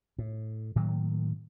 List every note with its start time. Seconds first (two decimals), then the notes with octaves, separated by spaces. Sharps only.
0.18 A2
0.76 A2 D#3 F#3 A#3